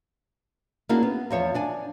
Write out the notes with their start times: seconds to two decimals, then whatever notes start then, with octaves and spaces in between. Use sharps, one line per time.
0.89 A#3 C#4 D4 E4 F#4 G#4
1.03 B3
1.30 E2 F3 C#5 E5
1.54 D4 D5 G#5